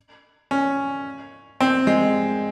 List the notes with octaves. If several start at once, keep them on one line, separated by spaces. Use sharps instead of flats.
C#4
C4
G#3